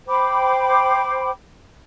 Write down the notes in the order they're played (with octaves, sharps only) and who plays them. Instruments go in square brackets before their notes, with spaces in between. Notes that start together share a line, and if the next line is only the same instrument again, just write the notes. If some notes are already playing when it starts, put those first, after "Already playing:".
[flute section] C5 G5 B5 D6